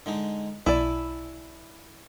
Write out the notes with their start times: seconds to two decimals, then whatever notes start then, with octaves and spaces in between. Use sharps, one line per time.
0.06 D3 G#3 D#4
0.66 B1 E4 D5 G#5 A5